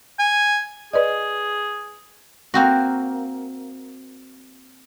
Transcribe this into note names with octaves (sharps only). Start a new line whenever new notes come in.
G#5
G#4 B4 D5 D#5
A#3 C4 F#4